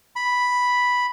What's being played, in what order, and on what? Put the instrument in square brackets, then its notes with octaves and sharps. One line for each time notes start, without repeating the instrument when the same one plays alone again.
[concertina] B5